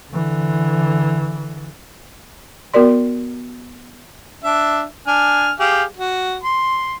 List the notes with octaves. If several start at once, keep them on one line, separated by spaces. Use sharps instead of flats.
D3 E3
B3 F#4 A#4 D5 C6
D4 E5
D4 G#5 F6
G4 G#4 F5
F#4
C6